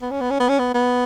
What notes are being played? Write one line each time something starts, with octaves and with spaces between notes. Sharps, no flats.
B3
C#4
B3
C#4
B3
C#4
B3
B3